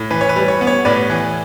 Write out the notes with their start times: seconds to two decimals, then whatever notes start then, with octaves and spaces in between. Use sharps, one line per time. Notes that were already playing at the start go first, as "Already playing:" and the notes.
Already playing: A2
0.11 E3 B4
0.21 C#5
0.29 B4
0.36 G3
0.48 C#5
0.61 B3
0.67 C#5
0.85 A2 B4 D5
1.10 E3